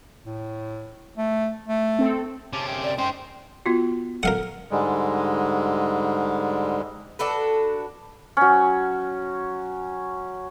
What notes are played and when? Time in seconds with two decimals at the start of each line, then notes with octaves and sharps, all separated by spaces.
0.25 A2
1.17 A3
1.68 A3
1.99 C4 A4
2.53 C3 C#4 A5 D6
2.67 F#2 G5
2.84 D5
2.98 F#2 C#4 D#4 C5 G5 C6
3.66 B3 F4 F#4
4.23 A4 A#4 F5 F#5
4.71 G#2 D3 G3 G#3
7.19 D4 F#4 A4 B4
8.37 F#3 C#4